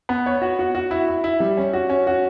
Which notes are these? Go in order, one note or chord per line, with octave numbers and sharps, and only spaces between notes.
B3
C#5
F#4
F#4
F#4
E4
E4
E4
G3
C#4
F#4
C#4
F#4